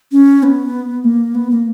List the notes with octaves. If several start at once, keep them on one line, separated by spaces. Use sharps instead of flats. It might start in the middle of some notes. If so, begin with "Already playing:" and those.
C#4
B3
A#3
B3
A#3